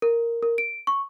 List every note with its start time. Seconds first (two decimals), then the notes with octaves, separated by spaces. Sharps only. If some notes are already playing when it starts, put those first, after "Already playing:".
0.02 A#4
0.43 A#4
0.58 D7
0.87 C#6